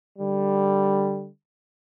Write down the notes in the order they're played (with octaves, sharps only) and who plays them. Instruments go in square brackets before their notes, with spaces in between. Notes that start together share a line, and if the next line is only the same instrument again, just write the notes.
[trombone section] D3 G3